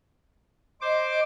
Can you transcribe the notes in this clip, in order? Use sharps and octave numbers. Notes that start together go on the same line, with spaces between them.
C5 D#5 D6